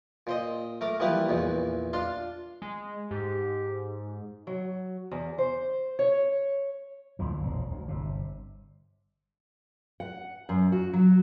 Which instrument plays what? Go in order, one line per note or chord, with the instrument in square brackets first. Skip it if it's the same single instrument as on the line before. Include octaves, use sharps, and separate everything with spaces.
[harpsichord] A#2 C5 D#5
A3 A#4 D6
E3 F3 G3 A#3 B4
A#1 E2 A#2
D4 F4 F5 C6
[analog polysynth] G#3
[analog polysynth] G#2 [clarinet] G4
[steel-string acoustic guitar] F#3
E2
C5
C#5
[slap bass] D2 A#2 D3 E3
E1 A#1 G#2
D2
G1 C3
[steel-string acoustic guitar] F#5
F#2
F#4
F#3